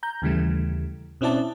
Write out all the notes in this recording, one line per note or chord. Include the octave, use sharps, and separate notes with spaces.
A#5 G6
D#2 C#3 E3 G3 A3
B2 C4 C#4 E4 D5 A5